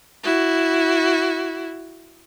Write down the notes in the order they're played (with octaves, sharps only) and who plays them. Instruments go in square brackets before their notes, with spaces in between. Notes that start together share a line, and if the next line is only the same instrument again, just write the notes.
[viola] E4 F#4